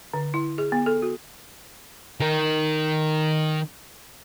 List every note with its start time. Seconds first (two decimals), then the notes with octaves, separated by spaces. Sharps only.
0.13 D3
0.34 E4
0.58 G#4
0.72 B3
0.86 A4
1.02 F#4
2.20 D#3 A#4